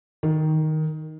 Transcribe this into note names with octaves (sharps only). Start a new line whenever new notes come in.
D#3